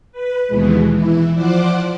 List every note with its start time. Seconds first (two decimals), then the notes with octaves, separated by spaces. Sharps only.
0.12 B4
0.48 D#2 B2 E3 G#3
0.92 E3 E4
1.33 F3 C5 D5 F#5 D6